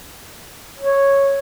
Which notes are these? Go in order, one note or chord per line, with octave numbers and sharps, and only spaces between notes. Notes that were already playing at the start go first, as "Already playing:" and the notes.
C#5